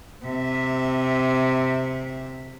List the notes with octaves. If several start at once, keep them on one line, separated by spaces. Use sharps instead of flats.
C3 E5